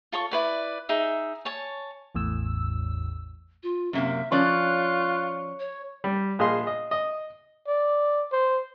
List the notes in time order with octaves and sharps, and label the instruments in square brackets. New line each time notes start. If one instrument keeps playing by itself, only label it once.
[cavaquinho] F4 A4 C#5 C#6
E4 B4 D5
D#4 G#4 E5
C#5 G#5 A5
[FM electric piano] A1 E2 A2 E6
[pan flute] F4
[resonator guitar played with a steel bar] F#2 C3 A#3 [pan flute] E5
[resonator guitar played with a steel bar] F3 C#4 D5 [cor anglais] F4 [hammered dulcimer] C#5 [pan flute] F#6
[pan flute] C#5
[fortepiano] G3
A#1 G#4 D#5 F5 C6
D#5
D#5
[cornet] D5
C5